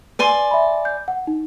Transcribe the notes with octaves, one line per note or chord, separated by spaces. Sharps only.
B4 D5 G#5 C6
E5 B5
G6
F#5
D#4